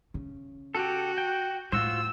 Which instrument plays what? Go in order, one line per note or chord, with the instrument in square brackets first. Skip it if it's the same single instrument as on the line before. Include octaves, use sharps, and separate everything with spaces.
[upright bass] C#3
[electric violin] F#4 [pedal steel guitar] G4 A4
[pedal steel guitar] G5
[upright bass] A2 [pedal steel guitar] F4 F#4 C5 [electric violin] E6